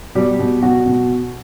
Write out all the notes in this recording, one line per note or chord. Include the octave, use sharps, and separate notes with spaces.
B2 G3 G4
B2
B2 F#4
B2